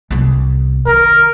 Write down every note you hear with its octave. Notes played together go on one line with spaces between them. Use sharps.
C2 B3
D#3 A#4